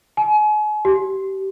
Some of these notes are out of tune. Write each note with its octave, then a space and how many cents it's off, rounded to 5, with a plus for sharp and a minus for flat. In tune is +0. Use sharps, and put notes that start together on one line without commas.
G#5 +35
G4 -25